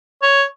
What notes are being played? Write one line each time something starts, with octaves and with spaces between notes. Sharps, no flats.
C#5